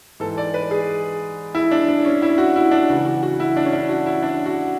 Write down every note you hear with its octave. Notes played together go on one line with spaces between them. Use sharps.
G#2 E3 A4
D5
B4
G#4
E4
D4
D4
C#4
E4
F#4
E4
D4
C#2 C#3 E3 F#4
F#4
F#4
E4
D4
C#4
D4
F#4
E4
D4
F#4